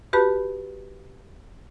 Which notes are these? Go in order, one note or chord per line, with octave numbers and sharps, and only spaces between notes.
F#4 G4 B4 A5 B5